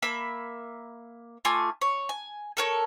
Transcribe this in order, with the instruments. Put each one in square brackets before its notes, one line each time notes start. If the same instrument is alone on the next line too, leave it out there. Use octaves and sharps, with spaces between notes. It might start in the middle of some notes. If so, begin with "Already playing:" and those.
[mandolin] A#3 E5 B5
A3 F4 G#5 D6
C#5
G#5
A4 A#4 C#5